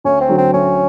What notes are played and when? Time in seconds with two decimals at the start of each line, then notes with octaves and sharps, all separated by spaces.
0.04 D2 C#4
0.21 C4
0.29 D3 F#3
0.38 C4
0.54 D2 C#4